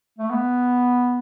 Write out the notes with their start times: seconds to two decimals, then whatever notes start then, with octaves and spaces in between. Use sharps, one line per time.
0.18 A3
0.31 B3